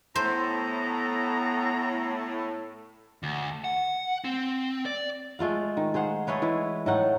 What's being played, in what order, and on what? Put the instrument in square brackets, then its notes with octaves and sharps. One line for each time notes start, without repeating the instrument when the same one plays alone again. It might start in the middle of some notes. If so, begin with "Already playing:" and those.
[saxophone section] A2 [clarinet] B3 [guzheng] C5 [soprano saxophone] A#5
[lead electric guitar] D2
F#5
C4
D5
[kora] G#3 A3 F4 F5
D#3
G#4 C5 F5 F#5
A3 G#4 B4 C#5
E3 G#3 E4
A2 A3 D#4 F#5